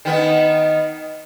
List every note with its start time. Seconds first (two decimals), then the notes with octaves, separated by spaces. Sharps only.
0.05 D#3 B3